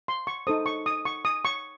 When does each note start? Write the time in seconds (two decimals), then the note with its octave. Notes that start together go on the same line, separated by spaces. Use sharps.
0.08 C6
0.27 C#6
0.47 D#4 A4 C5 D#6
0.66 C#6
0.86 D#6
1.05 C#6
1.25 D#6
1.45 C#6